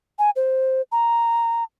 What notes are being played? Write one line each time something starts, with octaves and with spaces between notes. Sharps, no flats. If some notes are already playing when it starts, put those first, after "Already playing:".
G#5
C5
A#5